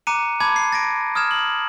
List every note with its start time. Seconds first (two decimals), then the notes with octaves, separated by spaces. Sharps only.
0.07 A#5 D6 F#6 C#7 D#7
0.40 A5 B5 D6 G#6
0.56 C7
0.72 A6 A#6 D7
1.15 D#6 F6 G#6 E7
1.31 F#7